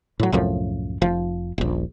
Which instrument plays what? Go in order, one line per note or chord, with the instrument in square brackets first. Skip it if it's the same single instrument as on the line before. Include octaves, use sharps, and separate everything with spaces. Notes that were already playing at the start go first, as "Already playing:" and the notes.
[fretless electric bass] A2 F#3
C2 F#2 A2 F3
F1 F3
D#1 A#1